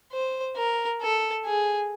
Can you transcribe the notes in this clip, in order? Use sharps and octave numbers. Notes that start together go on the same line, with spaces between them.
C5
A#4
A4
G#4